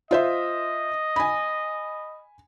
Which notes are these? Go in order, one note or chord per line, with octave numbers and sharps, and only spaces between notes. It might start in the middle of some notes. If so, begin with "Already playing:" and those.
F4 C5 D#5 E5
G#5 B5